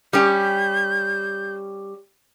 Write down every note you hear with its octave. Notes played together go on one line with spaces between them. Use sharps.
G3 C#4 G4 G6